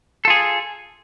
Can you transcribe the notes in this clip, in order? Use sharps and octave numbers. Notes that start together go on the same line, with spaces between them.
F4 G#4 A4